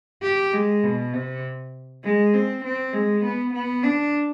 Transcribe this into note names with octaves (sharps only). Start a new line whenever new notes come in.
G4
G#3
B2
C3
G#3
C4
C4
G#3
B3
B3
D4